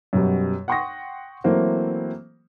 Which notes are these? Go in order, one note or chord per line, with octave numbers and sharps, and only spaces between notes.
F#2 B2 G3
F#5 G5 C6 C#6 D#6 A#6
E3 F#3 A3 A#3 C4